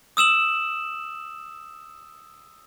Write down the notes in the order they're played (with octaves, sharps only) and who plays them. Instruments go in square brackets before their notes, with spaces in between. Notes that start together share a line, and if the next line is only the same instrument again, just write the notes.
[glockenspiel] D#6 E6 E7 F#7